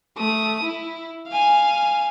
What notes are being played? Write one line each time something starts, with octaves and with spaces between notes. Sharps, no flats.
A3 D#6
E4
F5 G#5